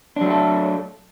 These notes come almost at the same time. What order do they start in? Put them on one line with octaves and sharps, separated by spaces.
D4 F#3 A3 A4